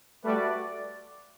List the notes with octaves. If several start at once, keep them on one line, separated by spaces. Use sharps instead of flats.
G3 A3 F#4 B4 D5